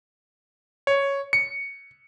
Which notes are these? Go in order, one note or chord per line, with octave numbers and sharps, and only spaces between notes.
C#5
C#7